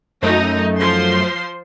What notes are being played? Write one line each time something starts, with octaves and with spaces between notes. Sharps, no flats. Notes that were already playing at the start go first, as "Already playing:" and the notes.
F#2 A3 D#4
F3 C5 C6